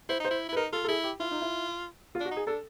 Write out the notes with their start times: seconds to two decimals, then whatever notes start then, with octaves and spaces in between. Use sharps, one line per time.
0.09 E4 C5
0.20 D#4 C5
0.30 E4
0.49 E4
0.52 B4
0.56 D#4 A#4
0.72 F4 A4
0.84 A4
0.88 E4 G#4
1.04 G4
1.20 E4 F4
1.31 D#4
1.42 E4
2.15 F4
2.20 D4
2.25 F#4
2.31 D#4
2.36 G#4
2.47 D4 A4